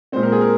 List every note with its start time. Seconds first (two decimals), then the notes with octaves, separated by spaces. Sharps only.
0.12 A#2 G#3 C4 C5
0.23 A#4
0.32 G#4
0.41 A#4